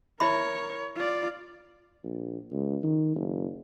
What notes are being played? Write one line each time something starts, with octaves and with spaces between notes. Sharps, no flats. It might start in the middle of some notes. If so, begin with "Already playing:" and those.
E4 A#4 C#5 E5 B5
F4 D5
A#1
C#2
D#3
F#1